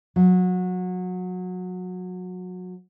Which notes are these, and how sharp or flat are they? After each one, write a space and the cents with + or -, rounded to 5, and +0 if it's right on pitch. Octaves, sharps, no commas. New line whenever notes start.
F#3 -25